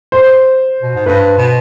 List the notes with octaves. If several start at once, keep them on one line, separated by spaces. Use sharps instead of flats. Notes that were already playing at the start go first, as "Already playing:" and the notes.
C5
B2
G#2
G2 B4
B2